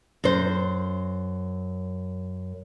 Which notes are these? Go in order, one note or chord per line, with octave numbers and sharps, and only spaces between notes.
F#2 C5